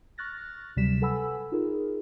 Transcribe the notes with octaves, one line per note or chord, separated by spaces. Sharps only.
C#6 F6 F#6 A6 A#6
D2 C3 F#3 G3 B6 E7
A4 B4 F#5 G#5 B5 E6
D#4 F4 G#4 A#4